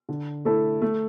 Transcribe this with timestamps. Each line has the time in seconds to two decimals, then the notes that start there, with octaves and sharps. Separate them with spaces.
0.09 D3
0.45 A3 E4 A4
0.82 A3